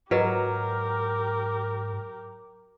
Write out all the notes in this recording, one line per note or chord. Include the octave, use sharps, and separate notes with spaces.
G#2 F#3 F4 G4 A#4 B4 D#5